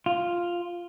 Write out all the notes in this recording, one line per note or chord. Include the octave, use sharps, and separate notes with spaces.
F4